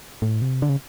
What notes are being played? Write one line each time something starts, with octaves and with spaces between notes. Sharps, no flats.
A2
C3
D3
C#3